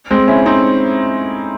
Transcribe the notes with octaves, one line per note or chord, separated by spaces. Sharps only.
G#3 C4
C#4 E4
C4 D#4